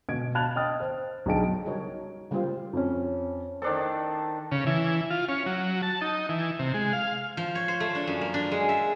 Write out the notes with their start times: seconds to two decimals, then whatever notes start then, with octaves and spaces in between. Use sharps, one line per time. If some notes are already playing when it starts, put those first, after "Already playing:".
0.09 B2 G#6 D7
0.35 F5 A5 B5 F#6 G#6 F7
0.56 D#5 G5 D#6 F6 A6
0.80 C5
1.26 B1 D4 G#4 G5 A5 D7
1.65 C#3 G3 D#4 F#4 A#4 C#5
2.31 C#3 G3 A#3 F4 G4 C5
2.73 F2 C#4
3.62 D#3 D4 A4 C5
4.52 C#3
4.66 E3
5.10 F4
5.29 C#4
5.46 F#3
5.83 A5
6.01 D#4
6.29 E3
6.59 C3
6.74 G#3
6.93 F5
7.37 F3
7.55 C#5
7.68 C5
7.80 A3
7.95 D4
8.07 F#2
8.21 A#3
8.34 D4
8.51 G#3
8.69 E5